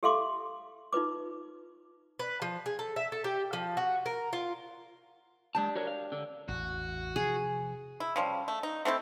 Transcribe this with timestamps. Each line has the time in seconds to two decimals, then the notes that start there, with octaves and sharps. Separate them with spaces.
0.03 G4 A4 E5 F5 C6 D6
0.93 D#4 F4 B4 D6
2.19 B4
2.42 F3
2.66 G#4
2.79 A4
2.96 E5
3.12 A4
3.24 G4
3.53 F3
3.77 F#4
4.06 A#4
4.33 F4
5.55 G#3 D4 G4 A5
5.75 F#4 A#4 C#5
5.87 F5
6.12 D3
6.48 A1 E2 F#4
7.16 C3 F3 G#4
8.00 E4
8.16 C#3 F3 G3
8.48 A3
8.63 D#4
8.85 A3 C4 E4 G4